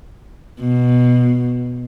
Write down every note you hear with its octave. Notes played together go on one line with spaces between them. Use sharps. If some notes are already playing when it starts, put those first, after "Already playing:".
B2